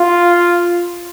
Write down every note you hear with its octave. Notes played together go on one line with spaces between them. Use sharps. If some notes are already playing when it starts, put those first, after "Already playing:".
Already playing: F4